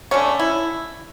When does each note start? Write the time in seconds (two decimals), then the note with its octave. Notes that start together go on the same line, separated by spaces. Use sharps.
0.11 D3 A3 C#4
0.39 E4